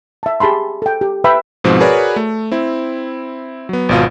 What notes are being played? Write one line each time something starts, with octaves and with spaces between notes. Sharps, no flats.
E5 A5
G4 G#4 A5 B5 C6
A4 G5
G4
B4 E5 G5 B5
G#2 B2 F3 C4
F#4 G#4 A#4 B4 C#5 D5
A3
C4 E4
F#3 B3
G#1 B2 F4